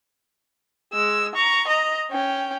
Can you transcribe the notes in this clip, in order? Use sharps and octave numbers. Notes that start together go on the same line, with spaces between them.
G#3 E6
A#5 C#6
D#5 A#5
C#4 G5